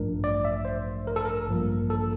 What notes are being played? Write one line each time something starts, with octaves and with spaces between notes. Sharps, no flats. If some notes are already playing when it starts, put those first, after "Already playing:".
Already playing: A1 G2 F3 A3 D4 A#4
D5
E5
C5
A#4
A4
A#4
A1 G2 F3 A#3
A4